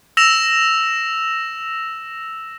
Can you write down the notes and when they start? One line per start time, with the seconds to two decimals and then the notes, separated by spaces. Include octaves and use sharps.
0.17 E6 A#6 E7 F7